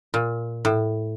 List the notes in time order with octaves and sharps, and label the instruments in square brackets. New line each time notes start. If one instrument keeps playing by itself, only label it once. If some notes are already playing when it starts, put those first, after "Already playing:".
[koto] A#2
A2